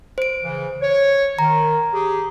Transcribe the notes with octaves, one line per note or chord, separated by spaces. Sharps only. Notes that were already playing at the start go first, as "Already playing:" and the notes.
C5 D7
C#3 E3
C#5
D#3 A#5
G4 G#4